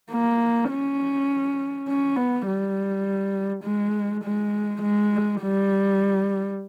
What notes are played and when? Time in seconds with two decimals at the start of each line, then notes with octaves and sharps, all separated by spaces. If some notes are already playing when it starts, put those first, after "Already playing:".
0.11 A#3
0.70 C#4
1.88 C#4
2.16 B3
2.46 G3
3.64 G#3
4.24 G#3
4.82 G#3
5.41 G3